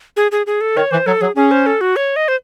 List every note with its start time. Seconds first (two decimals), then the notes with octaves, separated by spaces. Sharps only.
0.16 G#4
0.32 G#4
0.47 G#4
0.61 A4
0.76 D#3 C#5
0.91 E3 C5
1.06 F#3 A4
1.21 F#3 G#4
1.36 C#4 G#4
1.51 C5
1.66 A4
1.81 F#4
1.96 C#5
2.16 D#5
2.28 C5